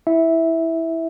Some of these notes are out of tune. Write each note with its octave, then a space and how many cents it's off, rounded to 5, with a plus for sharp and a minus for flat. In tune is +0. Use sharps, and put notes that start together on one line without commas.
E4 -5 E5 -10